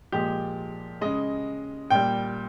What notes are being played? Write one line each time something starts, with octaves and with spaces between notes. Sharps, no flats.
A#2 F3 G#3 G4
C#3 G#3 D#5
A#2 G3 G5